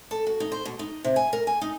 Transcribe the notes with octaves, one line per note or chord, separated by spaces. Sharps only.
A4
F#4
D#4
C5
B2
D#4
C3
G#5
A#4
G#5
D#4